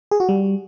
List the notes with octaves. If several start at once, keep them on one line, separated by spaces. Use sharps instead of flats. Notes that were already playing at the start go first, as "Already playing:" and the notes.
G#4
F#4
G3